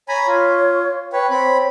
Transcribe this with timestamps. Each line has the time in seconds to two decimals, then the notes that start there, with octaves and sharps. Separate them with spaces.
0.08 C#5 G#5 A#5 B5
0.27 F4
1.13 B4 C#5 G5
1.30 C4 C#5 B5